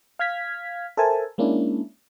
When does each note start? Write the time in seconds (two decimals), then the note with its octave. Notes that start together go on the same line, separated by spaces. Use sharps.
0.19 F5 F6 G#6 B6
0.97 A4 A#4 C5 E5 G#5 A5
1.38 G#3 A#3 C#4 D4 E4